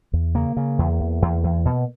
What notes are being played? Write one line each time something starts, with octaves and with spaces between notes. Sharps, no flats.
E2
C#3 A#3
C#3
E2
E2
E2
E2
B2